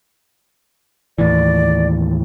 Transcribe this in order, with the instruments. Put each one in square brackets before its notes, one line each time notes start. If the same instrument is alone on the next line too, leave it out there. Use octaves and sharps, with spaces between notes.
[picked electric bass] D#2 A2 E3 [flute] D5